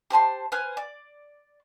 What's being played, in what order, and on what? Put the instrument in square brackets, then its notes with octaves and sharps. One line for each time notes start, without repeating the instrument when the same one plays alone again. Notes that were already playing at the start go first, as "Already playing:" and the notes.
[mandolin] G4 C5 A5 C6
B4 C5 G#5 F6
D5